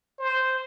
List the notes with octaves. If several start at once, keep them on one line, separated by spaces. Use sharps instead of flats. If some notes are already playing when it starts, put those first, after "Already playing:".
C5